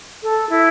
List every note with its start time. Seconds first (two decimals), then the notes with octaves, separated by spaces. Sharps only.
0.23 A4
0.49 E4